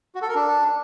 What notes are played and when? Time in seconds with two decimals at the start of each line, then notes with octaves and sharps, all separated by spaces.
0.15 F#4
0.22 A4
0.28 A#4
0.35 D4